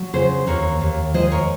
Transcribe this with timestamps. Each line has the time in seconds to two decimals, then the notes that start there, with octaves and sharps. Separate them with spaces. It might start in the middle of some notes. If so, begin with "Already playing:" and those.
Already playing: F#3
0.13 C#3 G#4 C5
0.47 D#2 A#4 C#5
0.81 D#2
1.14 G#3 C5 D#5
1.32 A#4 C#5